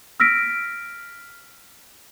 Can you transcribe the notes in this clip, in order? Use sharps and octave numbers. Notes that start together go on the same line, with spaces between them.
E6 F6 A#6 B6 D7